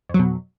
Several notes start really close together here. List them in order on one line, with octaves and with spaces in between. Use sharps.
F2 F#3 B2